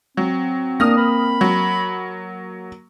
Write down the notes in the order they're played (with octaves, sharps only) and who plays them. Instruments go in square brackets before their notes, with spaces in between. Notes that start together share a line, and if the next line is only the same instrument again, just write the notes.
[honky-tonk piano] F#3 [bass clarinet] C4
[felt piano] A#3 [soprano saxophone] D4 [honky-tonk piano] D#6 F6 A#6
[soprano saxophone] B5
[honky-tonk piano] F#3